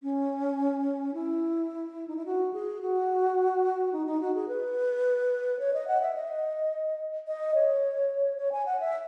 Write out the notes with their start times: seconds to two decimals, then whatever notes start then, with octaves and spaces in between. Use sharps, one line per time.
0.03 C#4
1.14 E4
2.08 D#4
2.16 E4
2.26 F#4
2.53 G#4
2.81 F#4
3.93 D#4
4.07 D#4
4.21 F#4
4.35 G#4
4.48 B4
5.59 C#5
5.73 D#5
5.88 F#5
6.01 E5
6.15 D#5
7.27 D#5
7.55 C#5
8.38 C#5
8.52 G#5
8.66 F#5
8.80 E5